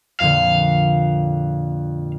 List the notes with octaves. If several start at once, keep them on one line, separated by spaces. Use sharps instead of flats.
F2 A#2 D3 F5